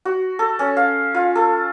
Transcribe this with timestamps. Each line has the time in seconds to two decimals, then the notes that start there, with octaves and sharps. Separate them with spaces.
0.05 F#4
0.39 A4
0.59 C#4
0.77 F5
1.15 F4
1.35 A4